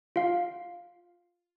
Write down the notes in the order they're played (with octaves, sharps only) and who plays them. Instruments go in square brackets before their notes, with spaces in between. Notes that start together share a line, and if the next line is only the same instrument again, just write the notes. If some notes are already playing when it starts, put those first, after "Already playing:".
[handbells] F4 F5